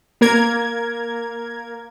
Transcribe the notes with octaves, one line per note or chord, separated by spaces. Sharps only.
A#3 A#4 G#6